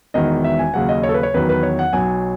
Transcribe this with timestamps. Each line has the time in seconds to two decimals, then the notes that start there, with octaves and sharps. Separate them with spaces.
0.14 E1 E2 D#3 D#5
0.44 E5
0.59 G#5
0.74 D#2 C#3 F#3 F#5
0.89 D#5
1.04 C#5
1.09 A4
1.14 B4
1.23 C#5
1.34 E2 D#3 F#3 B4
1.49 B4
1.63 C#5
1.79 F#5
1.93 B1 B2 F#3 G#5